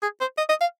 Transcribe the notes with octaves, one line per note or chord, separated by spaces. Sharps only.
G#4
C5
D#5
D#5
F5